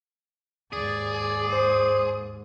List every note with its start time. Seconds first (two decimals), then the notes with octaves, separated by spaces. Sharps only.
0.73 D#2 G#2 G#4 D5
1.53 C5